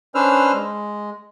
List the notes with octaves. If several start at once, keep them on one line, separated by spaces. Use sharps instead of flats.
C#4 D4 B4 C5 E6 F6
G#3